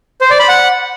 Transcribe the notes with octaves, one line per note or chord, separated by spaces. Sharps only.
C5
D5
B5
F#5